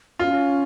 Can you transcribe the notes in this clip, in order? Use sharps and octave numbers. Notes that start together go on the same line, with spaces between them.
C#4 F4